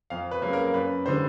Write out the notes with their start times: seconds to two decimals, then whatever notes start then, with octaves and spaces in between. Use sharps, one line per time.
0.10 F2 F5
0.31 B4
0.42 C#3 F#3 A#3
0.53 A#4
0.74 F#2 B4
1.06 D3 G3 C5